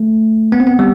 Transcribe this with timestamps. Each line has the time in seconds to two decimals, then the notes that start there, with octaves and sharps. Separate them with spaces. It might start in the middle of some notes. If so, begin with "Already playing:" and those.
Already playing: A3
0.52 B3
0.60 C4
0.67 B3
0.79 G3